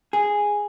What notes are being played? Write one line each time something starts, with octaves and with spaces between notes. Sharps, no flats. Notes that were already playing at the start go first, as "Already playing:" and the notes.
G#4